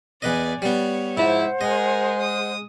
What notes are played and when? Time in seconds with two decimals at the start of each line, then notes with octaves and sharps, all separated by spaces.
0.22 E2 B4 D5 D#5 G#5
0.62 G3 B3 C#5
1.17 G#2 F3 E4 C5 F#5
1.61 G#3 G#4 A#4 D#5
2.20 D#6